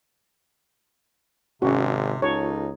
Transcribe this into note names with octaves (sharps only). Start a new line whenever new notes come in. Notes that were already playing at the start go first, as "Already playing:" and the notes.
G#1 C3 C#4 F#4 G#4
C#2 D#4 F4 A4 C#5